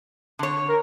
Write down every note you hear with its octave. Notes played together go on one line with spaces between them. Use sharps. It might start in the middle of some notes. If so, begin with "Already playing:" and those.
D3 C#5
A#4